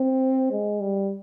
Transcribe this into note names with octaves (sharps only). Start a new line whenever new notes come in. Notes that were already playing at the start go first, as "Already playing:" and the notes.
Already playing: C4
G#3
G3